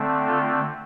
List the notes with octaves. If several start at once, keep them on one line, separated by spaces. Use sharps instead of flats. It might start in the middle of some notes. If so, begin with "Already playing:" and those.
Already playing: D3 A3 C4
F4 A4